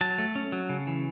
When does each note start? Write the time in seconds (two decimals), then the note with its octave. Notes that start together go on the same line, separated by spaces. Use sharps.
0.01 F#3 A5
0.18 A3
0.35 C#4
0.52 F#3
0.69 C#3
0.87 E3